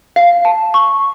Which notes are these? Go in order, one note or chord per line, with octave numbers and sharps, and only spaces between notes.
F5
A5
C#6